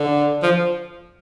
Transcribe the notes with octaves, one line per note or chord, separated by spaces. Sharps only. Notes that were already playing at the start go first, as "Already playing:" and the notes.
Already playing: D3
F3